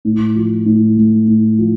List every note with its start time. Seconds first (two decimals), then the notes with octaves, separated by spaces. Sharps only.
0.05 A2
0.36 F3
0.66 A2
0.97 A3
1.28 A2
1.59 F3